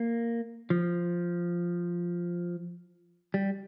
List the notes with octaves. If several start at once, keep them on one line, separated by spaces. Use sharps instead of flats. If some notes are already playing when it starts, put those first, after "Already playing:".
Already playing: A#3
F3
G3